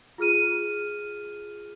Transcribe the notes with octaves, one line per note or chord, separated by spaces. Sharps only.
F4 G#4 F6 D#7